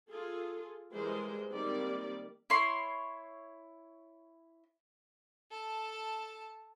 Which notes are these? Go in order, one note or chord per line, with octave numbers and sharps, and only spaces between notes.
F4 G#4 A4
E3 G3 G#3 G#4 A#4 C5
D#3 G3 A#3 C4 D5
E4 C#5 C6
A4 A5